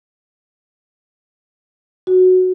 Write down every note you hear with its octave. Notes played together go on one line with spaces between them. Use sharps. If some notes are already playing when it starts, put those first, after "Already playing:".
F#4